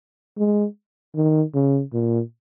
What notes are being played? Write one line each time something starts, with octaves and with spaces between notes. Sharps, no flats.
G#3
D#3
C#3
A#2